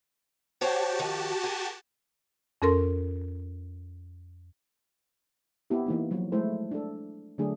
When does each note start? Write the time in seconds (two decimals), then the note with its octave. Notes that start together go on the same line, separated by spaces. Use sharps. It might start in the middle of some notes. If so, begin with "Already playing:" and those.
0.61 F#4 G4 C5 C#5 G5 A5
0.99 D#3 F3
1.43 G#4 A#4
2.62 F2 C#4 A4 A#4 C6
5.70 B3 C4 E4 G4
5.86 E3 A#3 D#4
6.11 F3 F#3
6.32 G#3 A3 E4 A4 C5
6.71 D4 A4
7.38 D3 F#3 A3 D4 G#4